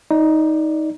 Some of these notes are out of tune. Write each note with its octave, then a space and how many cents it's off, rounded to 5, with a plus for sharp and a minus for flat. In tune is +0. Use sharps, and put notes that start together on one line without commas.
D#4 +15 D5 +0